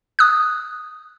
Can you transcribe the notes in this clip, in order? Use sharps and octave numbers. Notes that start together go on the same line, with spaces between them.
D#6 F#6